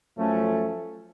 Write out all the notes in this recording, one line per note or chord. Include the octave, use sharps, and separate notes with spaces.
F#2 F3 A3 C#4